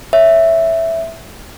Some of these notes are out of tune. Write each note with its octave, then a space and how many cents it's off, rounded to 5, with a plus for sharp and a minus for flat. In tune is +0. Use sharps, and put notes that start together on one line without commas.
C#5 +0 E5 +0